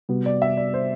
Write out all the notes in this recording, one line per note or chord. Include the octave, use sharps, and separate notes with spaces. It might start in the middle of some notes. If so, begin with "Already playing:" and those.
C3 G3 B3 F#4
D5
E5
D5
C5